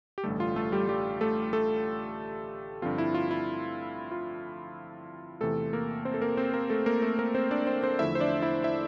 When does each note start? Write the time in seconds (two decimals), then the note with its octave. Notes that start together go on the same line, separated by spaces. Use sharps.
0.18 G4
0.24 A1 G2 D3 G3 A3 A4
0.40 F4
0.56 A3 A4
0.72 G3 G4
0.88 G3 G4
1.21 A3 A4
1.53 A3 A4
2.82 G2 D3 F3 C4 F4
2.98 E4
3.14 F4
3.31 E4
4.11 F4
5.41 E2 C3 E3 A3 A4
5.73 A#3 A#4
6.05 C4 C5
6.14 A4
6.21 A#3 A#4
6.37 C4 C5
6.54 A#3 A#4
6.70 A3 A4
6.86 A#3 A#4
7.02 A3 A4
7.19 A#3 A#4
7.35 C4 C5
7.51 D4 D5
7.67 C4 C5
7.83 C4 C5
7.99 E2 D3 F3 A3 E4 E5
8.15 C5
8.20 D4 D5
8.42 E4 E5
8.64 E4 E5